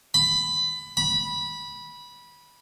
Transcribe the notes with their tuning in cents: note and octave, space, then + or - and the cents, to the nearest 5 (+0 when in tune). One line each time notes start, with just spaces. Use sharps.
B5 +20
B5 -15